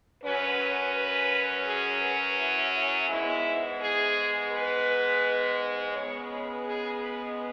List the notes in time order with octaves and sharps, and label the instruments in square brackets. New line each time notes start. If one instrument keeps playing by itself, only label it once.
[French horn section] F#2 F#3 C#4 B4
B4
G#4
B4
E4
E4
G#2 G#3 B3 E4
G#4
B4
C#3 G#3 B3 C#5
B4
G#4
B4